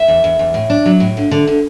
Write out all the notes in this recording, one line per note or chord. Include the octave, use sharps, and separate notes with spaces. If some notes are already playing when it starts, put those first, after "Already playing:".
Already playing: E5
E2
E2
E2
A2
D4
F#3
A2
D3
D3
D3